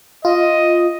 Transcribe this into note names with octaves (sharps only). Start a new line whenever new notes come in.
F4 D#5